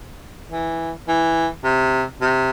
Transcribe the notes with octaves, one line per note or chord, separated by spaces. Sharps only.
E3
E3
C3
C3